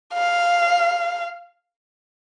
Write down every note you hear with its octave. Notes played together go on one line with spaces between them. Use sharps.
F5